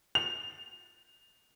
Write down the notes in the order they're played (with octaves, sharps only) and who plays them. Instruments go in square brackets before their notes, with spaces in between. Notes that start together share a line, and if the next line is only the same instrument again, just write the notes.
[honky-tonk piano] F7